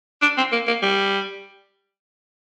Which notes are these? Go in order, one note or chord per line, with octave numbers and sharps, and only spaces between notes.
D4
C4
A#3
A#3
G3